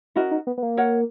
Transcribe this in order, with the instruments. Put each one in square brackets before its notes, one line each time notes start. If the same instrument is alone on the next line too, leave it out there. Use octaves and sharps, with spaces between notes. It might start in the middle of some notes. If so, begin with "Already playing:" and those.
[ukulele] C#4 F#4 A#4 D#5 [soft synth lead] E4
[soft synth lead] D#4
B3
B3
A#3
[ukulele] A#4 C#5 F#5